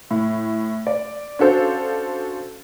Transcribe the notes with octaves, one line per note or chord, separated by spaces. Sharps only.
A2
D5
C#4 D4 F#4 A4 C5 F5